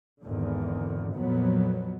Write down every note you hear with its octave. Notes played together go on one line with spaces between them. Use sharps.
G#1 E2 D3
F2 A#2 F#3 B3